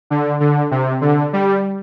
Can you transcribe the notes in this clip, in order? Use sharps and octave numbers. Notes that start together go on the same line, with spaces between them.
D3
D3
C3
D3
G3